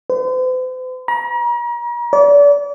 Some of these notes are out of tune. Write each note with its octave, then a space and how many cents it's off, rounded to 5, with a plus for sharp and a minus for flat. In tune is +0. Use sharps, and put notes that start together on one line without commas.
C5 -45
A#5 +40
D5 -35